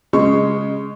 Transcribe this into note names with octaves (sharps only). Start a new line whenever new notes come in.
C#3 G#3 C#6